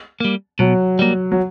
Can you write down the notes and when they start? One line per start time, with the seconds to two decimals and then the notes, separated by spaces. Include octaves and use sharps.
0.20 G3 A#3
0.59 B2 F#3
0.99 G3 A#3
1.32 F#3